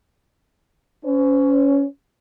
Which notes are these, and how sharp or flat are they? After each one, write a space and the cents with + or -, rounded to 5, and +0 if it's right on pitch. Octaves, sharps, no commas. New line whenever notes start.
C#4 +15 C5 -40